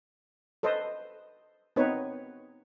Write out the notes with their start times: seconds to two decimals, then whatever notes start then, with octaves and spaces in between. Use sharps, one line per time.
0.63 A4 B4 C5 D#5
1.76 B3 C4 D#4 B4 C#5